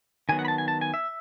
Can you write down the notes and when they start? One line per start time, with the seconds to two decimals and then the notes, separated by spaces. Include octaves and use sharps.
0.29 D#3 F#3 B3 G#5
0.39 F#5
0.45 B5
0.48 A5
0.58 G#5
0.68 A5
0.81 G#5
0.94 E5